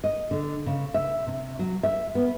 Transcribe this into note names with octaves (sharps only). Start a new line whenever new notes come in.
D#5
D3
C#3
E5
C3
F#3
E5
B3